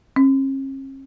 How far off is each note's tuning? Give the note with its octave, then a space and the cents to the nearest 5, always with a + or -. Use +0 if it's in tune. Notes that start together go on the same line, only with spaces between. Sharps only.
C#4 -45